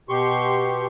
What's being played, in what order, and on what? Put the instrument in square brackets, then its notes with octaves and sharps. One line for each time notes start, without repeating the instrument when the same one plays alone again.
[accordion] B2 G4 C6 C#6